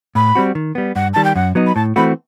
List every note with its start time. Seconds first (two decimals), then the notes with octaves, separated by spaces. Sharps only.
0.15 A2 B5
0.35 G3 C4 F#4
0.55 D#3
0.75 G3 B3
0.96 G2 F#5
1.13 D#3 G3 A5
1.24 G5
1.36 F#2 F#5
1.55 F#3 B3 D#4
1.67 B5
1.75 A2 A5
1.96 E3 A3 C4 F#4 B5